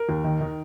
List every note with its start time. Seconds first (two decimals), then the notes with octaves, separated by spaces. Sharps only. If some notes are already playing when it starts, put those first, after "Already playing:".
Already playing: A#4
0.09 D#2
0.24 D#3
0.41 D#3